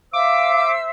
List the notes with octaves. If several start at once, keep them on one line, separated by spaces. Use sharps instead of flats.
C5 E5 F5 D6 E6